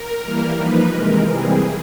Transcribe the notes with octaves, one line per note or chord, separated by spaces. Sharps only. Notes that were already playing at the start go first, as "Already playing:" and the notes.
Already playing: A#4
E3 G3 A#3
F3 A#3 D#4 B4
C3 E3 G#3 A#4
E3 G3 C4 G#4